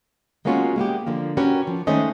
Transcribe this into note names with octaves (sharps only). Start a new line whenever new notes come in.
G#3 A#3 B3 C#4 F4 F#4
G#3 A#3 B3 G4
D3 F3 A#3
C#4 F#4 G4 A#4 B4
F3
D#3 G#3 A3 C#4 C5 D#5